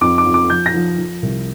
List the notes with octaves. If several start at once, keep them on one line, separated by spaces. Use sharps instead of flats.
F2 D6
D6
F2
D6
F3 G6
A#6
F3
F3
C2